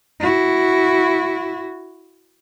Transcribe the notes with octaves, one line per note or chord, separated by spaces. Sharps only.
E4 F#4